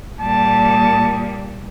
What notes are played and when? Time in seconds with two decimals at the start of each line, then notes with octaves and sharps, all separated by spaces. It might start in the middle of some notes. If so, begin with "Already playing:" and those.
0.21 A#2 G3 A5